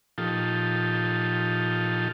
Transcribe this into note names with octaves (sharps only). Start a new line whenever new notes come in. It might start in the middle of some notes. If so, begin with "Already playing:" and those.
A#2 F3 D#4 F4 G4 A4